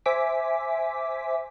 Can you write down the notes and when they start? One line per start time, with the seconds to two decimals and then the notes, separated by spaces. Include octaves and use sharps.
0.06 C5 E5 G#5 D6 B6